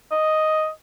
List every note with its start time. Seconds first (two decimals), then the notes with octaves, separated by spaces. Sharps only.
0.12 D#5